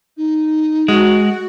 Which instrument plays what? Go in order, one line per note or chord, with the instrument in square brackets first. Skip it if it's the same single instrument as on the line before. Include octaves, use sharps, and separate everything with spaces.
[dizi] D#4
[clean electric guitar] G#3 [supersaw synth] F#4